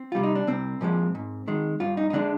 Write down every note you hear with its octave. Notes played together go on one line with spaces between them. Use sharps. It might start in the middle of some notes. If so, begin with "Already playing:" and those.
Already playing: C4
C3 G3 F4
D#4
D4
C2 C4
A#2 F3 G#3
G#2
D#3 G#3
G2 F4
D#4
D#4
D3 G#3 D4